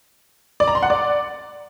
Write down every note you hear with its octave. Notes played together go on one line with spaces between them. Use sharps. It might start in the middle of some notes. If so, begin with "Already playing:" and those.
D5
A#5
C6
F#5
D5